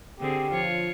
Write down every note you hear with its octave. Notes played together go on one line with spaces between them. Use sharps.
D3 C4 G4 G#4
F3 F4 C#5